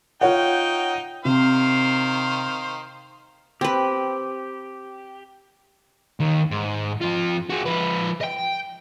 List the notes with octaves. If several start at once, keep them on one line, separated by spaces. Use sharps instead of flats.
D#4 F4 C#5 F#5 G5
C3 D#3 C5 F5
C4 G4 B4
D#2 D#3
G#2
F2 F4
F#4 G#4
F3 B4
D#5 G5